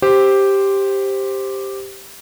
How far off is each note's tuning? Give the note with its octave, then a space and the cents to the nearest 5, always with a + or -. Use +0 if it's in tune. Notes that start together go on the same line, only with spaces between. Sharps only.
G4 +0 C5 +0